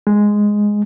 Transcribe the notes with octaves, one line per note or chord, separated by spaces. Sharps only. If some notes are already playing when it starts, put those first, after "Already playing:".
G#3